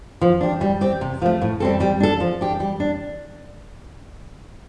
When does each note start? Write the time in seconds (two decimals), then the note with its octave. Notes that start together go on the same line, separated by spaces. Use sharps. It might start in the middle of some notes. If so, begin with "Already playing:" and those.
0.21 F3
0.41 D4 G4
0.61 G3
0.81 C4 G4
1.01 C3
1.22 F3 A3
1.42 A2
1.60 G3 C4 A4
1.80 G3
2.00 D4 A4
2.20 F3
2.41 D4 G4
2.60 G3
2.80 D4